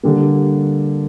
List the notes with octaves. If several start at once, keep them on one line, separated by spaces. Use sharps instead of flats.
D3 G3 A#3